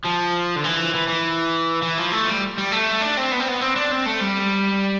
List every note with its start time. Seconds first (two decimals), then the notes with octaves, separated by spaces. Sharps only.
0.04 F3
0.56 D3
0.64 E3
0.94 E3
1.08 E3
1.82 E3
1.98 F3
2.12 A3
2.27 G3
2.58 G3
2.71 A3
3.01 D4
3.17 C4
3.32 B3
3.40 C4
3.48 B3
3.61 C4
3.76 D4
3.91 C4
4.06 A3
4.21 G3